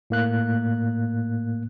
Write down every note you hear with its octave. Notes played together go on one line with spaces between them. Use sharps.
A2 A#3 F#6